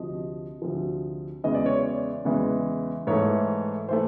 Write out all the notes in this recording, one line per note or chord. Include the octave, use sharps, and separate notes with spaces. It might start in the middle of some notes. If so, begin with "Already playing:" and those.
Already playing: D2 C3 F3 D#5
D2 C3 F3
E2 C#3 E3 G#3 D#5
D5
C#5
D5
E2 C#3 E3 G#3
G#2 E3 A3 C#5
E3 A3 C5